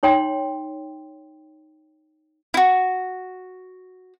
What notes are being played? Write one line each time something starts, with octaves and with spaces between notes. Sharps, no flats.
D#4 C#5 G5 C6
E4 F#4